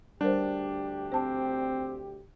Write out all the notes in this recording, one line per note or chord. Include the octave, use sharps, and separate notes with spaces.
D2 G3 D4 G4 A#4 C5
C4 C5 A5